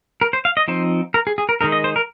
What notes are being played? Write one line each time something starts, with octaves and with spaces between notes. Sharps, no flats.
A#4
C5
F5
D#5
F3 C4 D#4 C5
A#4
G#4
G#4
A#4
D#3 G#3 D#4 A#4
D#5
C5
A#4